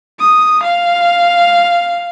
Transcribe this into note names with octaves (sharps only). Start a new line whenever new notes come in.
D#6
F5